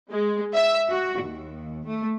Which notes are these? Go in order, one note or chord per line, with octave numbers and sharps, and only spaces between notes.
G#3
E5
F#4
D#2
A3